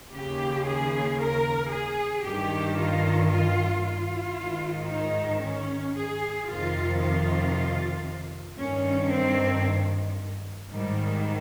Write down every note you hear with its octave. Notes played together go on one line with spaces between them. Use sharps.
D#2 C#3 G4
G#4
A#4
G#4
G2 D#3 G4
F4
F4
F4
G#2 D#3
D#4
C#4
G#4
F2 C3 D#3 F4
F4
G2 D#3 C#4
C4
G#2 D#3 G3